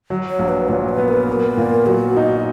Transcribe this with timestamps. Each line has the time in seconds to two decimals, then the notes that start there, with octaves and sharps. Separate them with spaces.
0.10 F#3
0.29 C#5
0.39 A#1
0.49 B4
0.68 A#2 C#5
0.89 B4
0.98 B3
1.08 A#4
1.28 B3
1.57 A#2
1.86 F#3 F#4
2.17 D#4